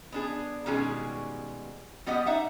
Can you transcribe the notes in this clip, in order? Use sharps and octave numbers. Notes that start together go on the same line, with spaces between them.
B3 D4 G#4
B2 D#3 G3 G#3 C#4 G#4
G3 B3 G4 D#5 F#5
D#4 E5 F#5